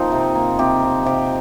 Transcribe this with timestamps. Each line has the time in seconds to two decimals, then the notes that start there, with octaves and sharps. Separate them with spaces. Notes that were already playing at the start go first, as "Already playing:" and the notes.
Already playing: F3 A#3 C4 D#4
0.12 C3
0.35 A#3
0.59 C3 G4
0.83 F3
1.06 C3 G4